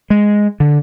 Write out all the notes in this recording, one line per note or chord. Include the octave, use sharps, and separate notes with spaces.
G#3
D3